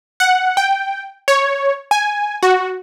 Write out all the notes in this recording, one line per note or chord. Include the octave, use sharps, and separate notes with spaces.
F#5
G5
C#5
G#5
F#4